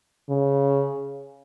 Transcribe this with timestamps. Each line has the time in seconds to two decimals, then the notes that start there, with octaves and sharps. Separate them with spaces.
0.29 C#3